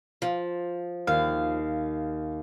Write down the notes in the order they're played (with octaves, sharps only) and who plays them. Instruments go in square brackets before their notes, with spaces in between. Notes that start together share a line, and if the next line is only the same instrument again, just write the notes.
[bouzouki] F3
[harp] D#2 [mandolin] F5